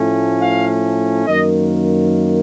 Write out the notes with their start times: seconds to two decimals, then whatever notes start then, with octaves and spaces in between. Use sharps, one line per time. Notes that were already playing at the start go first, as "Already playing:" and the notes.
Already playing: A2 F3 A3 C#4
0.39 F5
1.26 F#2 D#3 A#3 D#5